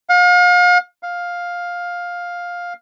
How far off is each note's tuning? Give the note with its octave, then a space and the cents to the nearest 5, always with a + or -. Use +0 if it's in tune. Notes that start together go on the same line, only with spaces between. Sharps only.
F5 +40
F5 +10